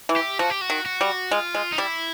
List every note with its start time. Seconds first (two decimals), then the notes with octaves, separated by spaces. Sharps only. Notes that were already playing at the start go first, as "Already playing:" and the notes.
0.09 E3
0.16 G4
0.39 F3 F#4
0.50 G4
0.61 F#4
0.70 D#3
0.86 F#4
1.01 G3
1.31 G#3 F4
1.55 G#3
1.72 D#4
1.78 G3 E4